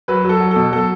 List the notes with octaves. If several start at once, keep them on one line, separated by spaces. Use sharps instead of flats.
F#3 B4
F#3 A4
F#3
B2 A4
F#3 A4